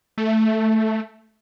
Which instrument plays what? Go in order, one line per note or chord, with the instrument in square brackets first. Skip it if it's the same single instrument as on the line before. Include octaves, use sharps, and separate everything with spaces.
[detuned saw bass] A3